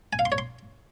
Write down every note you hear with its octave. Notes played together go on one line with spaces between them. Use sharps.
G#5
F5
C6
C#5
C6